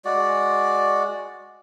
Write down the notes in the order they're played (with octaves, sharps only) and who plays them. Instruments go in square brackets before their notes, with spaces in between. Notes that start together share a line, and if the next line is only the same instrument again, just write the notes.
[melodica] G#3 F#4 D5